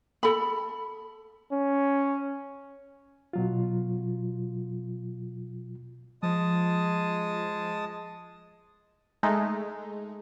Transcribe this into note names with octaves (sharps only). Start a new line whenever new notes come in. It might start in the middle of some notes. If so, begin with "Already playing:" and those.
A4 B5
C#4
B2 F#3 F4
F3 G#3 A5 D#6
G#3 A3 D#4